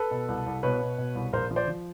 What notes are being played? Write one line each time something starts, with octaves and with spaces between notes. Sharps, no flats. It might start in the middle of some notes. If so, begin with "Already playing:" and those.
Already playing: A4 B4
B2
C2
C2
B2 B4 C#5
B2
B2
C2
A#1 A#4 C5
F3
C5 D5
F3